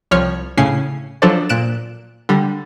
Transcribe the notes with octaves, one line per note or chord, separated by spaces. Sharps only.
C2 F3 C#5 F6 C#7
A2 C#3 C#4 C7
F3 F#3 D4 A4 C5 D5
A#2 F#6 D7 E7
D3 G3